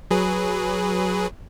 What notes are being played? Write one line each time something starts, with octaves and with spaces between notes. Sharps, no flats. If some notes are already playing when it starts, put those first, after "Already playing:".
F#3 G#4 B4